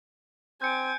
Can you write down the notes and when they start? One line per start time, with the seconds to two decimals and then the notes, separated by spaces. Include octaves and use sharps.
0.62 C4 G#5 G6 C#7 D7